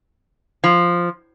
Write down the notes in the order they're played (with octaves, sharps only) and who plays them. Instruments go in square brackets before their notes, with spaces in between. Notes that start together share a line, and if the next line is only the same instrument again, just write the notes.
[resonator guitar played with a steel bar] F3